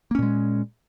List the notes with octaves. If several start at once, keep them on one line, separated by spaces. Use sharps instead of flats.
A#2 G#3 A#3 C#4